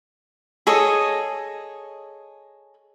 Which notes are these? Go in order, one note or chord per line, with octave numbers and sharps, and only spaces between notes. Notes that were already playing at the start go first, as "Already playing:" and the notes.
G#4 A4 C#5 D#5